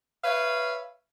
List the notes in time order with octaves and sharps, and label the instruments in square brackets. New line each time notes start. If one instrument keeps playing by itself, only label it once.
[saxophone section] B4 C#5 E5 F5